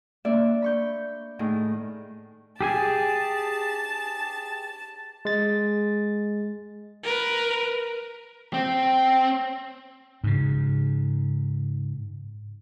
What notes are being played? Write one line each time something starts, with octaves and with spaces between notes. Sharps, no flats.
A#3 D4 D5 E5
B5 C#6 G6
A2 D#3 G#4
G4 G#4 G#5 A5
G#3 A6
A#4 B4
C4 G5
G#2 C#3